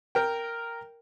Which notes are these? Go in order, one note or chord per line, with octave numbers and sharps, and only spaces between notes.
A#4 G5